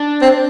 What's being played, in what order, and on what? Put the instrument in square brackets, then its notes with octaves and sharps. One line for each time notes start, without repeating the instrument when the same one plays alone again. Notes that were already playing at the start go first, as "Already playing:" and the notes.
Already playing: [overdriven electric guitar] D4
[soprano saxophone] C4